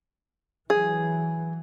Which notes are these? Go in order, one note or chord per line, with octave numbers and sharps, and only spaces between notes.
E3 F#3 G#4